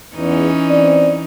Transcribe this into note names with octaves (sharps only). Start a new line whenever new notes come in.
E2 E3 C#4 D#4
C4 D5